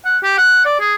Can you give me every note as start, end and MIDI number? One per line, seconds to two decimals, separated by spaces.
0.05 0.18 78
0.23 0.35 67
0.38 0.63 78
0.65 0.77 74
0.80 0.95 68